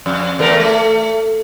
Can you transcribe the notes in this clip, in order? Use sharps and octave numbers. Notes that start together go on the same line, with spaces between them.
F2
E2 A3 A#4
A3